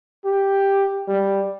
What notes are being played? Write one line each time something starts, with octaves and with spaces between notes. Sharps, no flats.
G4
G3